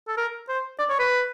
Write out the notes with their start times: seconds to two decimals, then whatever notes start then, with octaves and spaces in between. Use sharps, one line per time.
0.08 A4
0.17 A#4
0.49 C5
0.79 D5
0.90 C#5
0.99 B4